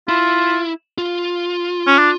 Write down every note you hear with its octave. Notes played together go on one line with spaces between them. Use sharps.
E4 F4
F4
C#4
D4